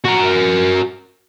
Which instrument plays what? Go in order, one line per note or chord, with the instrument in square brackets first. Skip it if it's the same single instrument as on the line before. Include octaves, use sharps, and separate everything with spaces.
[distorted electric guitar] F#4 A#4